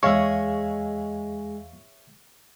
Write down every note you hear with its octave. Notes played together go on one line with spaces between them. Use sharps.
E2 G#3 C#5 E5 F5 C#6